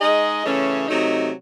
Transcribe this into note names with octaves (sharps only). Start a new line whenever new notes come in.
G#3 D#4 G#4 D#5
C#3 E3 A3 C#4
C3 F#3 A3 D#4